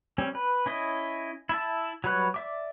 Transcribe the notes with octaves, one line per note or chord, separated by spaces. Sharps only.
G3 C4 C#4
B4
C#4 E4 D#5
E4 E5 A5
F#3 G3 B4 C#5 F#6
D5 E5 D6